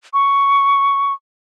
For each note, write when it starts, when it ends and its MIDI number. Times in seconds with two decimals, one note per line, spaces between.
0.14 1.13 85